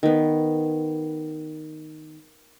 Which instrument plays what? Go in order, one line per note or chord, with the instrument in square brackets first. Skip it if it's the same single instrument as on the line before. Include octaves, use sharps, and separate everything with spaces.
[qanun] D#3 B3